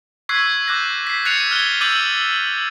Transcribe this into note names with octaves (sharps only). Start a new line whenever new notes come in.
C#6 E6 F#6 G#6 B6 C7
D6 F#6 G6 A#6
B6 C7
F#6 A6 C7 C#7 D#7 F7
F6 F#6 G#6 G7
D6 E6 G6 A6 D#7 F#7